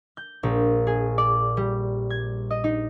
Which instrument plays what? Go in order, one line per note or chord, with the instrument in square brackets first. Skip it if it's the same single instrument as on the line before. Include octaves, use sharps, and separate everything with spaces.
[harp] G6
A#1
G#4
D5
G3
G#6
D#5
D#4